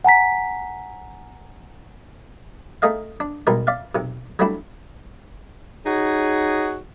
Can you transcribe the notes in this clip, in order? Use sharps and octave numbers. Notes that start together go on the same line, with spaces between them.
F#5 G#5 A#5 B6
A3 D#4 G#4 D#5 F5
D4
B1 B2 G3 G#3 A#4
D5 E5 F5
B1 C3
F#3 G3 A3 D4 E4
D#4 F#4 G#4 C#5